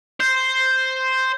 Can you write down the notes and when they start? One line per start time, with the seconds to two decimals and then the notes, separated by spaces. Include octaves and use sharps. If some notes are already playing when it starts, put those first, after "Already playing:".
0.20 C5 G6